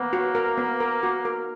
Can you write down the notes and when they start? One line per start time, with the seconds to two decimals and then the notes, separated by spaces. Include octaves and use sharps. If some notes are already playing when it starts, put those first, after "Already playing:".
Already playing: A#3 B3
0.13 F#4
0.35 A#4
0.58 B3
0.80 A#4
1.03 F#4
1.25 A#4